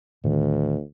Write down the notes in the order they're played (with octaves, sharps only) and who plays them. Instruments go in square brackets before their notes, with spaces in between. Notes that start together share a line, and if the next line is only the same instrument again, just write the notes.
[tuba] D2 [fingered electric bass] A2 D#3